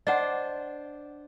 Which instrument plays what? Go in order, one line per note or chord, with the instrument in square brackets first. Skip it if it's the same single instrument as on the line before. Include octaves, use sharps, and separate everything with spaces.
[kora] D4 C5 [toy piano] D#5 F#5